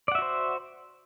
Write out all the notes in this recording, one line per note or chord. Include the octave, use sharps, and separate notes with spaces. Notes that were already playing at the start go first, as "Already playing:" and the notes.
F#4 C5 D5 E5 F#5